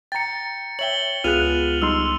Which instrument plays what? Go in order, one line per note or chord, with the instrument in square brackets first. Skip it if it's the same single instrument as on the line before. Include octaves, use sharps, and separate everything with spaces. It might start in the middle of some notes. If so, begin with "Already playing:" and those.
[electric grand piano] G5 A#5 [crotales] A6 C#7
[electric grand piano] C#5 E5 G5 [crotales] F#7 G7
[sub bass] C#2 [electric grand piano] B3 [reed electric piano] F4 G#4 F#6 [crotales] F6 D#7 F7
[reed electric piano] G3 D#4 C6 [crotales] E6